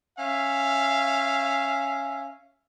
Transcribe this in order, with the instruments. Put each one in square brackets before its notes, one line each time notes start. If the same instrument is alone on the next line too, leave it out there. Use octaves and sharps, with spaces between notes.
[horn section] C#4 E5 F5